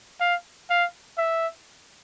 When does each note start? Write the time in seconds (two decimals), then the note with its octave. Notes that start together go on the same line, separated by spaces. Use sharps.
0.20 F5
0.70 F5
1.18 E5